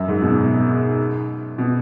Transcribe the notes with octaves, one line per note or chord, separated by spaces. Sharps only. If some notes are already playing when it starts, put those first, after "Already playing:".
Already playing: F#2
G#2
B2
B2